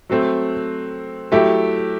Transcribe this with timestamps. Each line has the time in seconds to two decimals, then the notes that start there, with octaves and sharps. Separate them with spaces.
0.10 F#3 A3 C4
1.32 F#3 A3 E4 G4